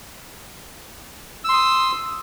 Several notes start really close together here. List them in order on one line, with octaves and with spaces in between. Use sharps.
E6 C6 D#6